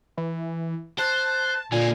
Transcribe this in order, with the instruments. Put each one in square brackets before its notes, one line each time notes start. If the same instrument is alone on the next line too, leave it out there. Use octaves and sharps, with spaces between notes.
[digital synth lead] E3
[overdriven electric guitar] C5 [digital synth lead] A5 [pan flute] F#6
[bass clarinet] A#2 [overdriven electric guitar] D3 A#3 [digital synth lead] G#5